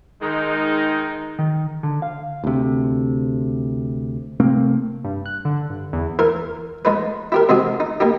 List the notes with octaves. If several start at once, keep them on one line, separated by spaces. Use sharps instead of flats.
D#3 G#3 D#4
D#3
D3
F5
D2 C3
C3 A3 A#3 C4
G2
F#6
D3
G2
E2
E3 A#4
G#2 G#3 B4
E4 G4 A#4
C3 G#3 F#4 G#4
D#4
A#3 D#4 G4